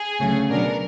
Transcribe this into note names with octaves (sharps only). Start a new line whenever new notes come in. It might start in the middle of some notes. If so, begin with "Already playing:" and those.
Already playing: G#4
D2 C#3 F#3 A3 C#4
B2 F#3 B3 D4 A#4